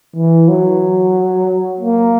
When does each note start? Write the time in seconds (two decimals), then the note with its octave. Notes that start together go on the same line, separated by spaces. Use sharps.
0.16 E3
0.49 F#3
1.80 A#3